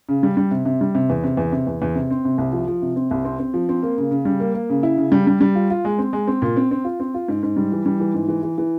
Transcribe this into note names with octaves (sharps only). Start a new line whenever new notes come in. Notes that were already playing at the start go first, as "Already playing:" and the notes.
C#3
G3
G3
C3
C3
G3
C3
E2
C3
E2
C3
E2
E2
C3
C4
C3
C2
F3
F3
C3
C4
C2
C4
C4
F3
C4
A#3
C#3
C#3
G3
A#3
A#3
C#3
E4
C#3
G3
G3
G3
F4
F4
G#3
C4
G#3
C4
A#2
C4
C4
F4
C4
F4
G#2
G#2
G3
E3
G3
E3
G#2
E3
E3
E3